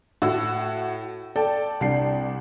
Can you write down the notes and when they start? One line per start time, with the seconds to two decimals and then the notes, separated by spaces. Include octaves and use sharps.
0.22 A2 F#4 E6
1.36 A4 D5 G5 A5
1.81 C2 D4 C7